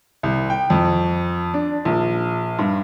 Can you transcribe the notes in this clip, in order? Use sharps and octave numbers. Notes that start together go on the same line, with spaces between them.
C2
G5
F2
D4
A#1
G2